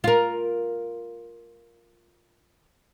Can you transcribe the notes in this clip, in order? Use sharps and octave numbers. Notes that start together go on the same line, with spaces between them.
F4 A#4